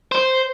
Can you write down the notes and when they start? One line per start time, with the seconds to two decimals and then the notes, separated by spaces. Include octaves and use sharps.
0.12 C5